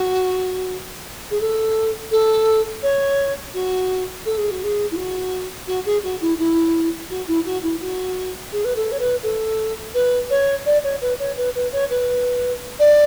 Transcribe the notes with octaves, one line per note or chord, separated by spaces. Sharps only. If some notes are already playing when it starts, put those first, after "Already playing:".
Already playing: F#4
G#4
A4
A4
C#5
F#4
A4
G#4
F#4
G#4
E4
F#4
F#4
G#4
F#4
E4
E4
F#4
E4
F#4
E4
F#4
G#4
B4
A4
C#5
B4
A4
B4
C#5
D5
C#5
B4
C#5
B4
B4
C#5
B4
D5